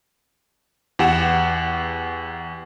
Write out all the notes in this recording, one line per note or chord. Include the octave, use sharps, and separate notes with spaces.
E2 G4 F#5 E7